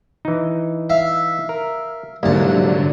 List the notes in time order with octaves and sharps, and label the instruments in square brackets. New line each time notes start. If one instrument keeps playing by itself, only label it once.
[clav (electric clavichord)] E3 D#4
[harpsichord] E5 F5
[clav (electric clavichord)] A#4
[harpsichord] C2 A5 [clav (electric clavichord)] G#2 A#3 [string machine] D3 F#3